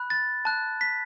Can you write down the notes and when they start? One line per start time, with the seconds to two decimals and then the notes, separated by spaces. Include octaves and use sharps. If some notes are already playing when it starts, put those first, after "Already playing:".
Already playing: B5 F#6
0.10 A6
0.45 A5 F#6
0.81 B6